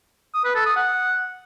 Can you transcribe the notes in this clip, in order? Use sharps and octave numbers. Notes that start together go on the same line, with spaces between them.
D#6
B4
A4
D#6
F#5